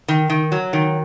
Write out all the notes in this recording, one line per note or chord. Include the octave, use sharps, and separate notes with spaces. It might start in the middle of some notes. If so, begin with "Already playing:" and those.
D#3
D#3
F#3
D#3